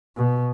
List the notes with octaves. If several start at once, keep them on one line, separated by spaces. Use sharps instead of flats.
B2